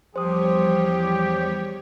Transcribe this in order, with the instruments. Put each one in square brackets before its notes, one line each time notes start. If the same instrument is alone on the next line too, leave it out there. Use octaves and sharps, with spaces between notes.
[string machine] E2 G3 C#5 [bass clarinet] F3 [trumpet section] G4 [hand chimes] C5 D#6